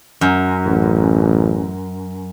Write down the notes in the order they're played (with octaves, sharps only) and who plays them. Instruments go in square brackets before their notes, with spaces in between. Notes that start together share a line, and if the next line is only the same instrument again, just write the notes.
[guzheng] F#2
[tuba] A1